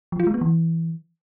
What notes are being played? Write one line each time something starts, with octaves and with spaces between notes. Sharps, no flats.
F3
F4
G#3
B3
E3